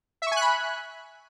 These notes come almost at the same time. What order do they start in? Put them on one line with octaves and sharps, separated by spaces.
E5 C#6 G#5 F#6 B5